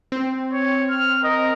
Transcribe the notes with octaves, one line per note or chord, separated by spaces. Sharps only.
C4
C#5
F6
A#4 D#5